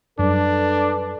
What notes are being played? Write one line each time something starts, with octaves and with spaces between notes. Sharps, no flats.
F#2 F#3 G3 D4 A4 B4